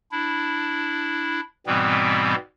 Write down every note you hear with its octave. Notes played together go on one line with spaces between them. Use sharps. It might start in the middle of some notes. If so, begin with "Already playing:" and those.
D4 E4
G#2 B2 E3 G3 B3 C4